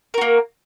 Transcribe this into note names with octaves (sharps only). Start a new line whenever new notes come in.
A#3 F#4 A#4